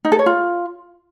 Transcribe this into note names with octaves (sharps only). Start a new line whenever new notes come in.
D#4
A4
C#5
F4